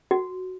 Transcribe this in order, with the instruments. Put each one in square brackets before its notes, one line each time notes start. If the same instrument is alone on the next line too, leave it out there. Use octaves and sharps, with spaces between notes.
[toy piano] F#4